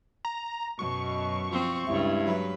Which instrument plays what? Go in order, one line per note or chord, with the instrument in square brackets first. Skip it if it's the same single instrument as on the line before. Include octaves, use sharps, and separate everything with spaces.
[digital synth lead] A#5
[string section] F#2 B2 [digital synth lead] C#6
[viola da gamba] F3 C4
[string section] C#2 [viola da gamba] G2 [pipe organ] E4
[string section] F#3 B4